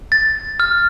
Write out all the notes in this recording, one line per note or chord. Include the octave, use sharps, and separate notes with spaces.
A6
F6